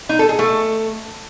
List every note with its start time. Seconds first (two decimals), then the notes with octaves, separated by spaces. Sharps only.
0.09 D#4
0.19 A4
0.29 G#4
0.39 A3